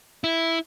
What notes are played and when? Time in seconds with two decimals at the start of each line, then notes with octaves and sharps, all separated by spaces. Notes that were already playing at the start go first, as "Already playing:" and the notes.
0.24 E4